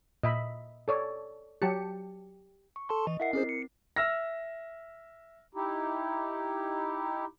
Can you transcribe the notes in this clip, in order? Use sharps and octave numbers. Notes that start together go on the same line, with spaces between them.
A#2 D#5 E5 B5
A4 C#5 D5
F#3 G4 A5 C#7
C#6
A4 A5 C6
E3 D#5
E4 A#4 E5 F#5 C7
C4 C#4 G#4 C5
C#7
E5 E6 F6 A#6
D#4 E4 G4